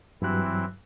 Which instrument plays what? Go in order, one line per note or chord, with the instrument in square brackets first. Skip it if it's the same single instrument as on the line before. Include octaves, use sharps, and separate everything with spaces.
[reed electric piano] G2 F#3 F#6 [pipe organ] E3 C4 E4